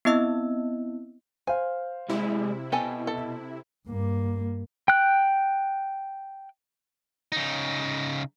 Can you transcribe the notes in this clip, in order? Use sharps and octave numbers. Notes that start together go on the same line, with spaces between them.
B3 C4 E4 D#5 E6
C5 F5 G#5
C3 G3 G#3 E4
B2 G4 A4 G#5
A4
G2 A#3
G5 F#6
C#3 D#4